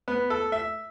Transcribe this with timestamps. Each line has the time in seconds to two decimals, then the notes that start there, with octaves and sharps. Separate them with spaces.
0.08 B3
0.30 A4
0.52 E5